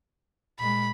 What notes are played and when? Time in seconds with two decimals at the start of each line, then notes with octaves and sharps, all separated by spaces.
0.59 A#2 G#3 B5